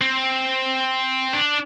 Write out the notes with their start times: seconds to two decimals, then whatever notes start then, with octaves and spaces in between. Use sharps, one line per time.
0.01 C4
1.33 D4